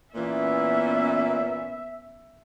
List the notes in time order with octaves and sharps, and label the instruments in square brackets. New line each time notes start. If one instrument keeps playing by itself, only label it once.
[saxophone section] A#2 E3 [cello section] B3 C#4 [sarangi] E5